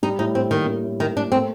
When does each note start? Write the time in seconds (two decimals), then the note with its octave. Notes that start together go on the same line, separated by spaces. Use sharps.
0.03 G3 D#4
0.19 A2 D#4
0.35 A2 C4
0.51 D#3 A#3
0.67 G3
0.84 A2
0.99 A2 D#3
1.16 A#3 D4
1.32 A3 C4